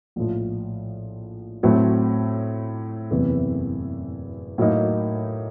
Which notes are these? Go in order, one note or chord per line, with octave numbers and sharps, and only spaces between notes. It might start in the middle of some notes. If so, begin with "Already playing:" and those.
A#1 A2 F3
A2 F#3 A3 C4
F#1 E2 C3 E3
A2 F#3 A#3 D#4